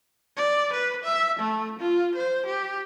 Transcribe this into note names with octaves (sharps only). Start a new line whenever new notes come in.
D5
B4
E5
A3
F4
C5
G4